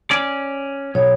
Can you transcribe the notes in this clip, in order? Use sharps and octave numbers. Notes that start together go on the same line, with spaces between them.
C#4 D5
B1 C#5